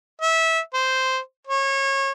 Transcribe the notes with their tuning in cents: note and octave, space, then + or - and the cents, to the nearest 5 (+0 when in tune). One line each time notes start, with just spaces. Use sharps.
E5 -20
C5 -5
C#5 -30